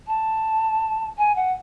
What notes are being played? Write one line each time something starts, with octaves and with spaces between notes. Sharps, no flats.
A5
G#5
F#5